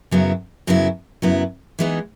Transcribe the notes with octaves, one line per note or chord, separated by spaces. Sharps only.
F#2 C#3 F#3 B3 E4
F#2 C#3 F#3 B3 E4
F#2 C#3 F#3 B3 E4
E3 G#3 B3 D#4